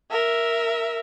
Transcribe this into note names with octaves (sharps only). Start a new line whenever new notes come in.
A#4 E5